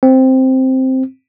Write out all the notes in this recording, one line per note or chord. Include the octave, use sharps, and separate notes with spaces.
C4